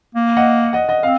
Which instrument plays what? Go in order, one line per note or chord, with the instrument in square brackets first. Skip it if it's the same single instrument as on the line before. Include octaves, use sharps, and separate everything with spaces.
[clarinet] A#3
[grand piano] D#5 F#5
D#5 F#5
D#5 F#5
[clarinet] C4 [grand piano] F5